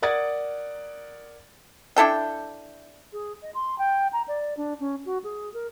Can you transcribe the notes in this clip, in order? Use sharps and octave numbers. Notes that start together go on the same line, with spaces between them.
A#4 D5 F#5 D#6 G#6 A6
D4 E4 A4 G5
G#4
D#5
C6
G5
A#5
D5
D4
C#4
F#4
G#4
A#4